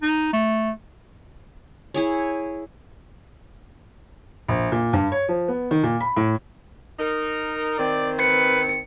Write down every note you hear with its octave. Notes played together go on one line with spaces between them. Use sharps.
D#4
A3
E4 G#4 C#5
A#1
A#2
G2
C#5
F3
B3
D#3
A#2
B5
A2
D#4 A#4
D#3 C4 D5
B4 C#7